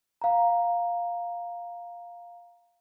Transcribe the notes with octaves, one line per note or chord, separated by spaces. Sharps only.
F5 A#5